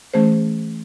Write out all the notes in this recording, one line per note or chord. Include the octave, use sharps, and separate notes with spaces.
E3 A3 C#4 G#4 C5